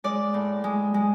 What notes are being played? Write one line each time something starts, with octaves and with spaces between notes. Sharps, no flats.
G#3 D5
A2
G#3
G#3